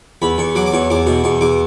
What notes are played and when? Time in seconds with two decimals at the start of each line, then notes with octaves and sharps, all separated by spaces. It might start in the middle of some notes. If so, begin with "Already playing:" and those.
0.22 E2 B5
0.38 E2 C#6
0.55 F#3 D6
0.66 D6
0.73 E2 C#6
0.90 E2 D6
1.07 B2 C#6
1.24 E2 C#6
1.41 E2 D6